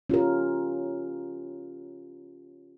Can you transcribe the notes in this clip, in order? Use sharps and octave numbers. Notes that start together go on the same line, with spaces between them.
C#4 F4 G4 A#4